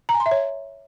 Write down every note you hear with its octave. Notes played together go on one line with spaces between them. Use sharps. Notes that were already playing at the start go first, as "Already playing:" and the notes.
A#5
G#5
C6
E5
C#5